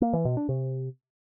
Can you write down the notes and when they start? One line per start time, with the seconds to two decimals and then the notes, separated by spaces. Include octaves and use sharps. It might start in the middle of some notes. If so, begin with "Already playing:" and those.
0.02 A#3
0.13 E3
0.25 B2
0.37 D4
0.49 C3